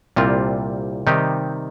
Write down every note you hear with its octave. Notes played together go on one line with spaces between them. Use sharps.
C2 A#2 G3 C4 F4
C3 D#3 G3 D#4 G4